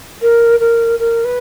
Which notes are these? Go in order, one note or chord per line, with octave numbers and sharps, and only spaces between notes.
A#4
A#4
A#4
B4